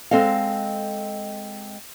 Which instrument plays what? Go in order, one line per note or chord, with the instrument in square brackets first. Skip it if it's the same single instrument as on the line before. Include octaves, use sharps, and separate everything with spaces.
[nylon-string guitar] G#3 C4 A4 D#5 F5